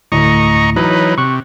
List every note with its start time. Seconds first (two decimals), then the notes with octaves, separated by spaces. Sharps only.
0.12 D2 A2 D#5 A#5 C#6
0.76 E3 F#3 D#4 B4 C#5
1.18 C3 C#6 F#6